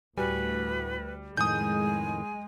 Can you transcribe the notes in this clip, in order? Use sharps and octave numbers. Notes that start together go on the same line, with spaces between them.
D2 A2 G3 F#4 B4 G#5
F2 A2 D#3 G#3 G#5 D#6 G6